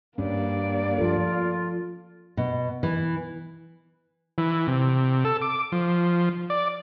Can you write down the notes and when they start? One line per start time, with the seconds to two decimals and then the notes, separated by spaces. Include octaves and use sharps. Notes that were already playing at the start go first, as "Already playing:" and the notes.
0.18 G2 A#3 C#4 D5
0.98 F3 F4 A4
2.37 B2
2.83 E3
4.38 E3
4.67 C3
5.25 A4
5.42 D6
5.72 F3
6.50 D5